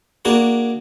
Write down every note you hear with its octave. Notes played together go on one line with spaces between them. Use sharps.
A#3 D4 F#4 G#4